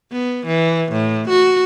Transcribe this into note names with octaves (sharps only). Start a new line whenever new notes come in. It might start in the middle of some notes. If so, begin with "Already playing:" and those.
B3
E3
A2
F#4